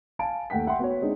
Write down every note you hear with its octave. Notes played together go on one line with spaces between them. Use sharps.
F5 G#5 A5 D7
D#2 A3 F#5 G5 B6
E5 F#5 G5 C6
B3 F#4 C#5
G#3 C4 D4 D#4